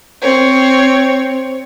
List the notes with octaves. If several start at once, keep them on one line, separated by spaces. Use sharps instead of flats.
C4 C#5